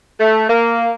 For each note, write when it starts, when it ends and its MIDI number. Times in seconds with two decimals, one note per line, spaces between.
0.20 0.46 57
0.49 0.95 58